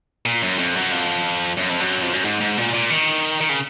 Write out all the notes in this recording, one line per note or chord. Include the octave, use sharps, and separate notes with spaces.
A#2
F#2
F2
F#2
F2
F#2
F2
F#2
F2
F#2
G#2
G#2
A#2
A#2
D#3
D#3
C#3